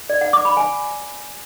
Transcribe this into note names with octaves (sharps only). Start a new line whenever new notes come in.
D5
F#5
D6
B5
G#5